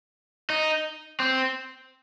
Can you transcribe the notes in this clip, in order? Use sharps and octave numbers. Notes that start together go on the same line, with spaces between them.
D#4
C4